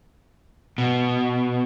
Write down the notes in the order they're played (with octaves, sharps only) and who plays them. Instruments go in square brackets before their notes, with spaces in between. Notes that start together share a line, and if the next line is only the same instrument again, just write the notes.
[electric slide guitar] B2